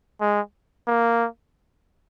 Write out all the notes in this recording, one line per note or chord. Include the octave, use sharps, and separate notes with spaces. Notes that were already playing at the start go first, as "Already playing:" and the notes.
G#3
A#3